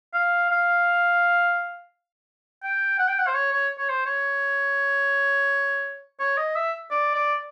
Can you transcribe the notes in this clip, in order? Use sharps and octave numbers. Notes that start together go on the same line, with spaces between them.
F5
F5
G5
F#5
G5
F#5
C5
C#5
C#5
C#5
C5
C#5
C#5
D#5
E5
D5
D5